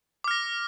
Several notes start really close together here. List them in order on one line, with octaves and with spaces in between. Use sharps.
D6 F6 A#6